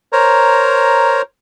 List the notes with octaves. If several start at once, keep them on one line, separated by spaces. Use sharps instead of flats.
A#4 C5 C#5 A#5